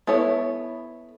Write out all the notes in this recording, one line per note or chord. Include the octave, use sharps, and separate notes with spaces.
B3 E4 A4 C#5